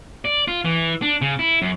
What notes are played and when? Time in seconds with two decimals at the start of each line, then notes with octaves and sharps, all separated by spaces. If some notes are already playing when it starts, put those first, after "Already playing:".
0.25 D5
0.48 F4
0.65 E3
1.02 D4
1.21 C#3
1.39 E4
1.62 F#2